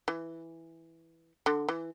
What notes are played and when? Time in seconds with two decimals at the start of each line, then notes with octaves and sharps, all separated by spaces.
0.08 E3
1.46 D3
1.69 E3